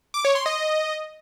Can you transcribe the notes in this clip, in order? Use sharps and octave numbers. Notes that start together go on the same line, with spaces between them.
D6
C#5
C6
D#5